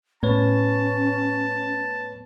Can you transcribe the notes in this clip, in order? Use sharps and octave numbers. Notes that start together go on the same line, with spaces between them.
A2 B3 C#4 B4 C#5 A5